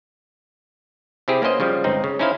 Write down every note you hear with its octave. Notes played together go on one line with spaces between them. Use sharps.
C3 C4 E4 G4 G#4
A#3 B3 C#4 C5 D#5
C#3 F3 G3
G1 C#2 C4 D#4
C#3
C#4 D#4 E4 C5 F5